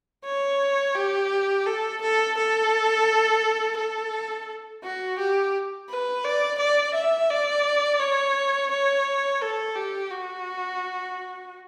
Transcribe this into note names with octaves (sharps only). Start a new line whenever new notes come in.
C#5
G4
A4
A4
A4
A4
F#4
G4
B4
D5
D5
E5
D5
C#5
C#5
A4
G4
F#4